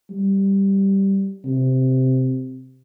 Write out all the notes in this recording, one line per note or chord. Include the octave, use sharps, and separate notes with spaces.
G3
C3